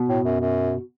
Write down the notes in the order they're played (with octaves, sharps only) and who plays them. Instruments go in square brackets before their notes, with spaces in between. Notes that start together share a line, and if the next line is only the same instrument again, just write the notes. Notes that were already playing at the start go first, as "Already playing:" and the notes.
Already playing: [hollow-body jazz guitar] B2
[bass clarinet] A2
F#2
F#2